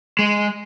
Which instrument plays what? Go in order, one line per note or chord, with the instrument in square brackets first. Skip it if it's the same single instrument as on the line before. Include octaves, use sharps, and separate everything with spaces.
[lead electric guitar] G#3